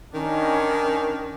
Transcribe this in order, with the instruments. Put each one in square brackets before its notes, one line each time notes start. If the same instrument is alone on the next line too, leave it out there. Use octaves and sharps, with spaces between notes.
[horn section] D#3 D4 [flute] C#4